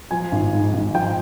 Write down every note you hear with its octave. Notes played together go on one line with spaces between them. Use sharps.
F3 G#5
G#1
G#2
G#1
F3 G5